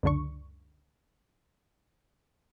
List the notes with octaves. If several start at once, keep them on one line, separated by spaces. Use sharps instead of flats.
C#2 F#2 D3 D4 C#6